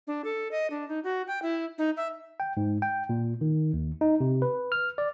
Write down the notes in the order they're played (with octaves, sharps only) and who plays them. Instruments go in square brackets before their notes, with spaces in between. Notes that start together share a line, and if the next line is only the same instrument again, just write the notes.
[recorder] D4
A4
D#5
D4
D#4
F#4
G5
E4
D#4
E5
[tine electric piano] G5
G#2
G5
A#2
D#3
D#2
D#4
C3
B4
F6
D5